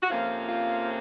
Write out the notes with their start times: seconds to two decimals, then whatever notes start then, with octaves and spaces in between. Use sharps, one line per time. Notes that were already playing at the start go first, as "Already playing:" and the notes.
0.02 F#4
0.10 F2 C3 F3 A#3 C#4 F4
0.49 F4